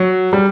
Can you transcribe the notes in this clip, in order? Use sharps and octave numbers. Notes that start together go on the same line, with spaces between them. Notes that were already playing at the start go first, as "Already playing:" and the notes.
Already playing: F#3
G3